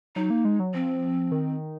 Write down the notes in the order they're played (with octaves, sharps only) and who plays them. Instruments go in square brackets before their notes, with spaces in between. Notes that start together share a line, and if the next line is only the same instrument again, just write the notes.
[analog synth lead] F#3 [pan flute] D#4
[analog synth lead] A#3
G#3
F#3
[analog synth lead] F3 [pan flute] C4
[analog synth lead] D#3